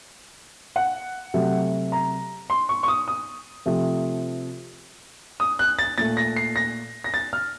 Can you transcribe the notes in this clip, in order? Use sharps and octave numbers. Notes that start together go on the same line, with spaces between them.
F#5
C3 F#3 A3
A#5
C6
C#6
C#6
D#6
D#6
C3 F3 A3
D#6
F#6
A6
A#2 A3 A6
A#6
C7
A#6
A#6
A6
F6